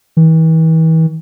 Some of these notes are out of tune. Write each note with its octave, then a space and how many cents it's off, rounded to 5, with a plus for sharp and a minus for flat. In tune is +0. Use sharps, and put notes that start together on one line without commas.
E3 -40